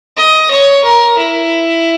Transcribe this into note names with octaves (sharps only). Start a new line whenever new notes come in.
D#5
C#5
A#4
E4